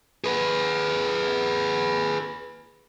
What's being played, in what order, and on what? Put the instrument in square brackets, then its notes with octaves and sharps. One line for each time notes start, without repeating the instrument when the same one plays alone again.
[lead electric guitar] G#4 B4